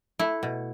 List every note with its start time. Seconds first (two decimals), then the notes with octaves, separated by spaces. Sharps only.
0.19 A3 E4
0.43 B2